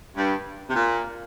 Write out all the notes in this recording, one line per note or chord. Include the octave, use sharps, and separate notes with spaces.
G2
C3
A#2